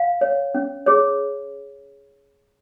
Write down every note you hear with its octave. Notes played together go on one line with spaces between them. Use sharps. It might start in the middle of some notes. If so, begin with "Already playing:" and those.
Already playing: F5
C#5
C#4
G#4 C#5